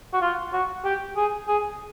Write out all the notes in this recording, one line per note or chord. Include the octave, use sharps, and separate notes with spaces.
F#4
F4
F#4
G4
G#4
G#4